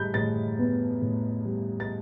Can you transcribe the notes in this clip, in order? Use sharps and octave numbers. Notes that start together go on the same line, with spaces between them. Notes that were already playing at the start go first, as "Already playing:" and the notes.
Already playing: A2 G3 B5 G6
A2 A6
B3
A2
G3
A6